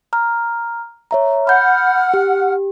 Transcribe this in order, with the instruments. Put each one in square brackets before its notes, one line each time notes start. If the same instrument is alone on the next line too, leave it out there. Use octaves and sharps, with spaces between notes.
[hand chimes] A#5 F6
C#5 E5 A#5
[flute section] F#5 F6 [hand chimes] B5 G6
[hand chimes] G4